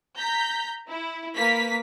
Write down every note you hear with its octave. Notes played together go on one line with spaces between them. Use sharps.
A#5 G6 B6
E4
A#3 B4 B6